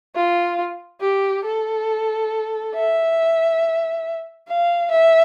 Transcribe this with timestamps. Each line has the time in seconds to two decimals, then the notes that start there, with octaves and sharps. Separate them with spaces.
0.15 F4
1.01 G4
1.45 A4
2.75 E5
4.47 F5
4.91 E5